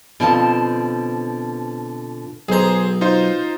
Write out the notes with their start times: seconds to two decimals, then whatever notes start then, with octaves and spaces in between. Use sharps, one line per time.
0.20 B2 D3 F3 C4 F4 A5
2.49 B1 G#4 C5 A#5
3.01 D#4 F4 C5